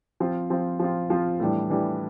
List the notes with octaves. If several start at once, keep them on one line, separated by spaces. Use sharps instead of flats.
F3 C4 F4
F3 C4 F4
F3 C4 F4
F3 C4 F4
A2 E3 G3 D4
A2 E3 G3 D4